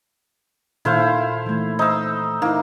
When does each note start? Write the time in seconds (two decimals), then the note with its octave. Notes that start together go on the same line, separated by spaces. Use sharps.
0.85 A#2 D#3 E4 A4 C5 F5
1.46 E3 A3
1.79 D#4 C5 E6
2.42 A#3 D#4 E4